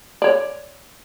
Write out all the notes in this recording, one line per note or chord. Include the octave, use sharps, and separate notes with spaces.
C#5 D5